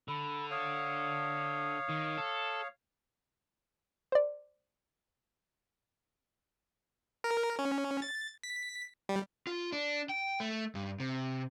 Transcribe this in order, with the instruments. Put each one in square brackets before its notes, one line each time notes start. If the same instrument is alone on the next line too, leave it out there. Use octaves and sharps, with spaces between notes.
[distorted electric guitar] D3 [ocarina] B5
[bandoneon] C#5 F5 [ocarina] D#6
[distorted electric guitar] D#3
A4
[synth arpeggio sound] C5 D5
[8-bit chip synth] A#4
C#4
A6
B6
G3
[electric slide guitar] F4
D4
G5
A3
G2
C3